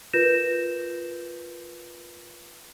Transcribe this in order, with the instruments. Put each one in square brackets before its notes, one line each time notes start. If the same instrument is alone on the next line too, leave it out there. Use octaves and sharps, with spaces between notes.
[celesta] F4 A#4 B4 G6 A#6 E7